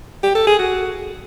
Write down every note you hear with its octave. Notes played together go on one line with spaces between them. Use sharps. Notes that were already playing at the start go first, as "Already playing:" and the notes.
G4
A4
G#4
F#4